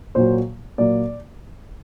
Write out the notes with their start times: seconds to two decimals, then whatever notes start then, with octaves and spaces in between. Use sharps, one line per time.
0.15 A#2 F#3 A#3 C5
0.78 A#2 F#3 A#3 D5